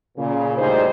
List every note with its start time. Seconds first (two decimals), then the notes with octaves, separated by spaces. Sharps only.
0.18 A#2 C#3
0.58 D2 A2 G3 D#4 G#4 C5